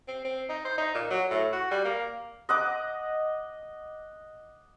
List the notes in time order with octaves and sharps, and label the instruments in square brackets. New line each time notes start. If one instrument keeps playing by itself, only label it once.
[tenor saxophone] C4
C4
D#4
C5
D#4
A#2
F#3
A2
F#4
G3
A#3
[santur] D#5 F#5 D6